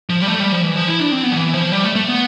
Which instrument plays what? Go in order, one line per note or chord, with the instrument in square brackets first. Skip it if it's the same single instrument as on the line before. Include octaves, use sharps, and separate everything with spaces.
[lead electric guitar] F3
G3
A3
G3
F3
E3
F3
E4
D4
C4
B3
F3
E3
F3
G3
A3
A3
B3